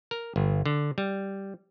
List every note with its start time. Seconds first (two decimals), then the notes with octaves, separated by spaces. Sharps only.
0.11 A#4
0.36 G1
0.66 D3
0.98 G3